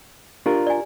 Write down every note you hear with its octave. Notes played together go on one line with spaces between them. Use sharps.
D4 F4 G4 A#4
D5 G#5